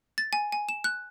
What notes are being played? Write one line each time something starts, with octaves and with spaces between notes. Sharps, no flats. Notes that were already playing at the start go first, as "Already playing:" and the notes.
A6
G#5
G#5
E7
F#6